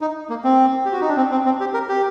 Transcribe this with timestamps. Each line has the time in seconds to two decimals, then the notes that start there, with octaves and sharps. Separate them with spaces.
0.01 D#4
0.30 A#3
0.44 C4
0.85 G4
0.92 F#4
1.01 D#4
1.08 D4
1.17 C4
1.32 C4
1.46 C4
1.60 G4
1.74 A#4
1.89 G4